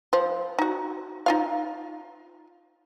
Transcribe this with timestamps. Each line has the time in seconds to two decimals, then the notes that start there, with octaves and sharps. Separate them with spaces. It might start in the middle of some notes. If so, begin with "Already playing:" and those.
0.13 F3 C5
0.59 D#4 F#4
1.26 D#4 F4 F5